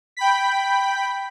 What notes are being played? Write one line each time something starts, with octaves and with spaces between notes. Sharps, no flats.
G5 B5 B6